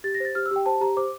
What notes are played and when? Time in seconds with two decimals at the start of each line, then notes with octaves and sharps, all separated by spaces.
0.04 G4 A6
0.14 A#6
0.20 C5 A6
0.35 G4 F6
0.46 E6
0.51 G4 G5
0.66 C5 A5
0.81 G4 A#5
0.97 C5 D6